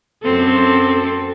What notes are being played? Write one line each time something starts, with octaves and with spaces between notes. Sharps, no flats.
F#2 C4 A4